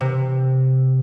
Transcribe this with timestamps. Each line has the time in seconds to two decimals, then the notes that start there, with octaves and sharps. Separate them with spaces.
0.01 C3